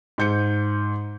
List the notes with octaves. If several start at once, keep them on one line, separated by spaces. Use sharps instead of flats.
G#2 G6 C#7